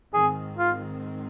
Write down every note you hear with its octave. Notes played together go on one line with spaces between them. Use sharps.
G#2 D#3 C4 G#4
F4